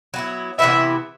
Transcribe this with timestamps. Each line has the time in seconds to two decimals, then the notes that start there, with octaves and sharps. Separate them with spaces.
0.14 F#3 B3 E4
0.59 C3 E3 B3 E4 E5